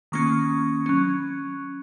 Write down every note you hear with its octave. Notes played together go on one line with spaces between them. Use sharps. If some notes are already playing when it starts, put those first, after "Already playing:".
D#3 A#3 C#4 C#6
F#3 C#4